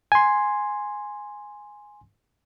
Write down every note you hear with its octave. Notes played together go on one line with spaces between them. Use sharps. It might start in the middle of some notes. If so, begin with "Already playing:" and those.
G#5 C6